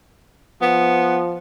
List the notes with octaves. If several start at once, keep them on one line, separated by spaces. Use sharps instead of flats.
F3 B3